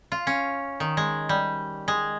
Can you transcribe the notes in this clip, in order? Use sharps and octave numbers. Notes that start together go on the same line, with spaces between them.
F4
C#4
D#3
G#3
G3
G#3